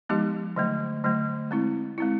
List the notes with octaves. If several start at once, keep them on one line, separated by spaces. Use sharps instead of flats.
F3 G#3 B3 D#4 G4
D3 F#3 A3
D3 F#3 A3
G#3 C4 E4
G#3 C4 E4